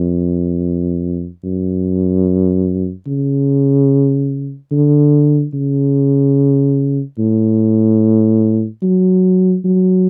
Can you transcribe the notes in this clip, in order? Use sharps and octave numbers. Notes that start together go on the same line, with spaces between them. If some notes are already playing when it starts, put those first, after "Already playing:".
Already playing: F2
F#2
C#3
D3
C#3
A2
F#3
F#3